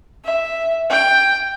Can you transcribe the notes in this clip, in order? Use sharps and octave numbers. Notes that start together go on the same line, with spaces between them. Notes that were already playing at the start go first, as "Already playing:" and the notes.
E5
G5